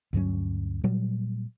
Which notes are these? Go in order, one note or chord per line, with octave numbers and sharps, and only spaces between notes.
D2 G2 F#3 C#4
A#2 F#3 G3